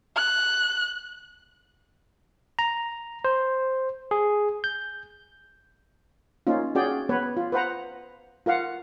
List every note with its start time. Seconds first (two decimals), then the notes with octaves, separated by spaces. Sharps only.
0.16 F#6
2.59 A#5
3.25 C5
4.11 G#4
4.64 G6
6.47 A#3 C#4 D#4 F4
6.75 C#4 F#4 G#4 D5 G5
7.09 B3 B4 C#5
7.37 F4
7.52 B4 C5 F#5 A#5
8.46 F4 A#4 F5 F#5